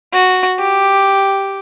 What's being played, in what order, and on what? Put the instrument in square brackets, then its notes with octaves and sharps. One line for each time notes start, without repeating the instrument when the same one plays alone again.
[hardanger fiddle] F#4
G4